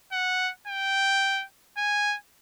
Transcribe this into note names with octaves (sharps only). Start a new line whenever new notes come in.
F#5
G5
G#5